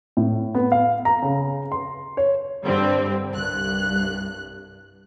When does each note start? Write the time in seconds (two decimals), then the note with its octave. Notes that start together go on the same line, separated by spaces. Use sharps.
0.17 A2
0.55 B3
0.72 F5
1.05 A#5
1.22 C#3
1.72 C6
2.17 C#5
2.64 G2 D3 G3 C4
3.31 C2 G2 F#6